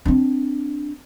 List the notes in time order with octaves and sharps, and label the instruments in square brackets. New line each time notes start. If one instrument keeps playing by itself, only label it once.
[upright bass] C4 D4